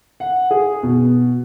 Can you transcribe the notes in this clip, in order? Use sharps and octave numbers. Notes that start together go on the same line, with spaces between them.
F#5
G#4
B2